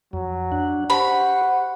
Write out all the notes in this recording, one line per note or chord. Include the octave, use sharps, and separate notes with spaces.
F2 F#3
D4 F#5
G4 C5 F#5 B5 C#6